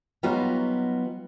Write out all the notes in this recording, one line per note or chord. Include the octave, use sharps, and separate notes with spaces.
F#3 G3 B3 D#4 F4 G4